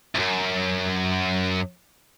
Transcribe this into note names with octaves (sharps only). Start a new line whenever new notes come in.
C2 F#2